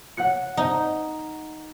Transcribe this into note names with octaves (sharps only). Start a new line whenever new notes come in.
F#5 F#6 C#7
D#4